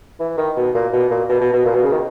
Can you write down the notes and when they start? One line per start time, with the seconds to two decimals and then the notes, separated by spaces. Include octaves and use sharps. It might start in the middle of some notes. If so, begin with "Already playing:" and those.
0.20 E3
0.38 D#3
0.56 B2
0.74 A#2
0.93 B2
1.10 A#2
1.29 B2
1.41 B2
1.53 B2
1.65 A#2
1.74 B2
1.83 C#3
1.92 D#3